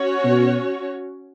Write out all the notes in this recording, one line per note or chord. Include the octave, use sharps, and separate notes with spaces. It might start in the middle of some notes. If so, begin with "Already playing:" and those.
Already playing: C#4 F#4 C#5
B2